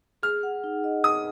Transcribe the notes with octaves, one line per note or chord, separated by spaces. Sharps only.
G#4 F6
F#5
D#4
D#5
G#4 D#6